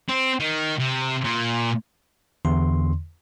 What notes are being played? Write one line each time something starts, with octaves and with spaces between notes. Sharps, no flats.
C4
D#3
C3
A#2
E2 D3 C6